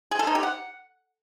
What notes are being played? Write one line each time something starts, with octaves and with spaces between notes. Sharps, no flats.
G#4
A4
D#4
G4
F#5